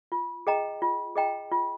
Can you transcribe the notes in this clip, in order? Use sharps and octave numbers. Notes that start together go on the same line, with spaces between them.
F4
G#4 D#5 G5 A#5
F4
G#4 D#5 G5 A#5
F4